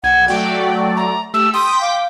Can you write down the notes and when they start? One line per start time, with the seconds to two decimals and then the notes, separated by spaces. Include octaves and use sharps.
0.04 B1 F#5 G#6
0.28 F#3 A3 F#4 D5 G5
0.97 A#5
1.34 A3 G4 E6
1.54 G5 C6 D#6 B6
1.81 F5 D6